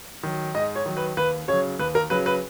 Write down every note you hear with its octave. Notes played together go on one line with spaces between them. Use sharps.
D#3 F#3
G#2 D#5
C#5
D#3 F#3
B4
D#2 B4
C#3 F#3 C#5
D#2 B4
A#4
C#3 F#3 B4
B4